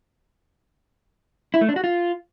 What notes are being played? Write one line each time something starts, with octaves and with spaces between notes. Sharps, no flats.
E4
A3
D4
F#4
F4